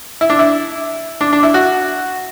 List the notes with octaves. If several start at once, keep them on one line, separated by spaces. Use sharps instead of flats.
E4
D4
E4
D4
D4
E4
F#4